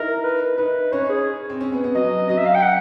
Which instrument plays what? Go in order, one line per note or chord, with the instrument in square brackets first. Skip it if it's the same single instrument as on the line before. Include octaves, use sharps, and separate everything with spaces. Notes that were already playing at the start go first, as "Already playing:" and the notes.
Already playing: [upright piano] D#4 E4 [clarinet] A#4
[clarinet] B4
[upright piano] D#4 [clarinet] B4
[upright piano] C#4 [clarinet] C#5
[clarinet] G#4
[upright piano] C4
C#4
B3
B3
[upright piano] F#3 [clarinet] D#5
[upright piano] F#3 [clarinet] D#5
[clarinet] E5
F5
G5
F#5